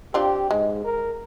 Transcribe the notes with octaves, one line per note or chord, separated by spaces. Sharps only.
C4 D4 F4 G4
G#2 G#3
A#4